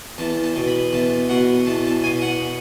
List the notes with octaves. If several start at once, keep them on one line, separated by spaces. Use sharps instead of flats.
E2 A5
A5
B2
B5
E2 A5
B2 F#5
E2 A5
A5
B2 G#5
F#5